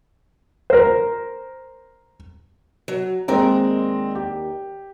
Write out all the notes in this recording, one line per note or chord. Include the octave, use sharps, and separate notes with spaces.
A#4 C5
F#3
D#2 G#3 C4 A#4 D5 A#5
G4